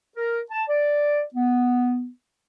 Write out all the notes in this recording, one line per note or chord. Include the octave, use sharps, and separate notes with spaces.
A#4
A5
D5
B3